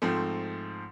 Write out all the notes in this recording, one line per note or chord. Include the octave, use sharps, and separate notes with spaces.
G#2 F3 A3 C4